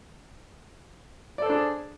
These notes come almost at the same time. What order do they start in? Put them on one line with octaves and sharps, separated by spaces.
D5 A4 C5 D4 G#4